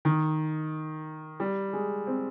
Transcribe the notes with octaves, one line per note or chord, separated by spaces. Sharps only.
D#3
G3
G#3
C4